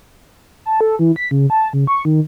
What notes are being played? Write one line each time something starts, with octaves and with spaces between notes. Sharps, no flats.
A5
A4
E3
B6
C#3
A5
C#3
C#6
D#3